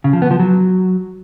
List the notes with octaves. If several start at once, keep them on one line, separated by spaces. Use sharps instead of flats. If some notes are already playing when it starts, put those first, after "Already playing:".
C#3
F3
B3
F3
F#3